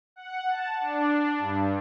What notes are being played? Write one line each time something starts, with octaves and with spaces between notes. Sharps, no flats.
F#5
A5
D4
G2